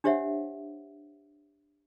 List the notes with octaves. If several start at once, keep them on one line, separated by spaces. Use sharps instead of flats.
D4 G4 C5 C#5 E5 F#5